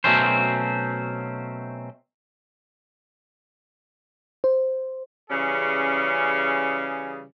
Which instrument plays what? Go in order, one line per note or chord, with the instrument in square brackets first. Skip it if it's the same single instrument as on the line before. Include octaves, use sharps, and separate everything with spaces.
[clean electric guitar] B2 F#3 A3 C4 C#4 C5
[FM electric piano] C5
[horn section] C#3 E3 G3 C#4 G#4